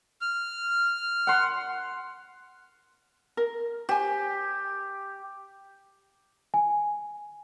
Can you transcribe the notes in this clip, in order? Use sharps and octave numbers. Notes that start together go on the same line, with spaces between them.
F6
F#5 C6
A#4
G4 C5 G#5
G#5